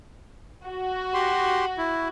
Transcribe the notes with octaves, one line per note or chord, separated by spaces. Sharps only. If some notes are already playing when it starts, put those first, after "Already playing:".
F#4
G4 C6
E4